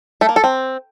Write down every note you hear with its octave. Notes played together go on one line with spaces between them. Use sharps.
A3
A#3
A4
C4